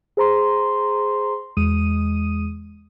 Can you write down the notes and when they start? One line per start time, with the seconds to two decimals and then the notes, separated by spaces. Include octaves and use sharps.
0.17 G#4 C5 A#5 C6
1.57 E2 G#3 D#6 D#7